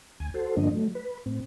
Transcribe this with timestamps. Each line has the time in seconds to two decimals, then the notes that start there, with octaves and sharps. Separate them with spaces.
0.20 D2 G#5
0.34 F#4 A4 C5
0.57 G2 D3 F3 A#3 D4 D#5
0.74 F#3 A3
0.95 B4
1.26 A2 C4